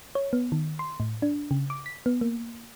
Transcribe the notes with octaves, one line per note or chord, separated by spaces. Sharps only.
C#5
B3
D#3
C6
A2
D4
C#3
D6
B6
B3
A#3